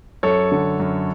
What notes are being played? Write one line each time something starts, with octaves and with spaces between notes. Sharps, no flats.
F#2 A4 C#5
D3
F#2